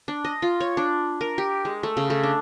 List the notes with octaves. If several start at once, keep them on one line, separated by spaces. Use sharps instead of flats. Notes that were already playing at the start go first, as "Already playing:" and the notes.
D4
D#5
F4
C#5
D4
A#4
G4
G#3
A3
C#3
A3
D4